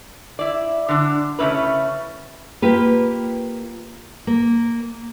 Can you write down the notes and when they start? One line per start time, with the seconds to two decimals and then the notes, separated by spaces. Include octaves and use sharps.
0.39 E4 D5
0.88 D3 D4
1.39 C#3 A3 C#4 E4 B4
2.62 A#3 F4 G4 B4
4.27 A#3